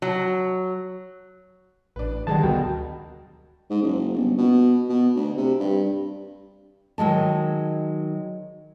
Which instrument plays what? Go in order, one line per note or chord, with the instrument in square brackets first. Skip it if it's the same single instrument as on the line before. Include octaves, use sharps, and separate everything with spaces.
[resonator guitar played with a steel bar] F#3
[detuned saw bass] A1 [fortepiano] D4 B4
[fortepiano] F#2 D3 G#3 [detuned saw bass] D#3 [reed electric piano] G3 A5
[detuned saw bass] D2 [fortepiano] B2 [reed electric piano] F#4 A#4 G5
[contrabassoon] G#2
F#1
G1
B2
B2
D2
C3
G2
[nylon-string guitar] D#3 F#3 G#3 A5